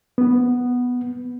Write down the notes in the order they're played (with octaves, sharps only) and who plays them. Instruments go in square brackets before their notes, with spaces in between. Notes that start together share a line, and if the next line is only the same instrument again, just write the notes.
[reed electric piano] B3